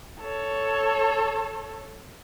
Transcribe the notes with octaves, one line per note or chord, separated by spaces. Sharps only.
A4 C#5